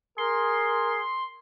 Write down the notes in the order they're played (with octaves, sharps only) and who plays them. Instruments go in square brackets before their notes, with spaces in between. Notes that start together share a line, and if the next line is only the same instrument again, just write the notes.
[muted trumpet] G#4 [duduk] A#4 [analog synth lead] C6